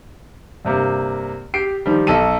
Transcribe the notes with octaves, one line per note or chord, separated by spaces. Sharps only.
G2 C3 A#3
G4 C7 D7
D#3 F3 G3
B1 A4 D#7